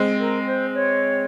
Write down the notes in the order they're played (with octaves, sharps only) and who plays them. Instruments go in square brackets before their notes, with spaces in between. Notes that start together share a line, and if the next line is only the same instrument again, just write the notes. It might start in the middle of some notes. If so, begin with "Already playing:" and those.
Already playing: [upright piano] G#3 C4
[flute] A#4
C5
C#5